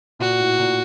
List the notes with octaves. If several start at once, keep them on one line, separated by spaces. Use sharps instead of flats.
A#2 F#4
A2
A#2